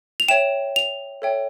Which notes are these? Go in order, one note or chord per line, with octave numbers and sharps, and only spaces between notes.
F7
C#5 E5 G5 E7
F7
A4 C#5 E5 G5